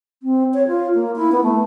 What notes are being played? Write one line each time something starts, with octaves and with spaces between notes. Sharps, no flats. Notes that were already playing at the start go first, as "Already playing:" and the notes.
C4
C#5
F4
A#3
E4
B3
A3